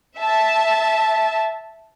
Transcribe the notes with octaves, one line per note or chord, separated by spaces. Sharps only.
E5 A5